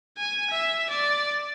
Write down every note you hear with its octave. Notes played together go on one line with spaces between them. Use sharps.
G#5
E5
D5